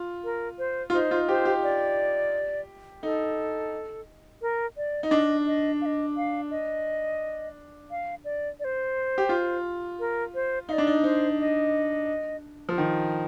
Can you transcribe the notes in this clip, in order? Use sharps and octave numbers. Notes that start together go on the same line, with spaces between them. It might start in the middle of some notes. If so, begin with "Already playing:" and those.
Already playing: F4
A#4
C5
F4
D#4 C5
F4
G4 C5
G4
D5
D#4 A4
A#4
D5
D#4
D4 D#5
D#5
F5
D#5
F5
D#5
F5
D5
D5
C5
G4
F4
A#4
C5
D#4 D5 F5
D4
D#4
D#4 C5
D#5
F3
D#3